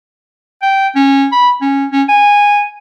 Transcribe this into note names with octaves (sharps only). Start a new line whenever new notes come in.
G5
C#4
B5
C#4
C#4
G#5